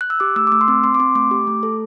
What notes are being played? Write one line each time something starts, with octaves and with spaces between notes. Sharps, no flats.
F#6
E6
G4 D6
A3 E6
D6
A3 E6
C6
C4 D6
C4 C6
D6
C4 C6
A3 D6
G4
A3
A4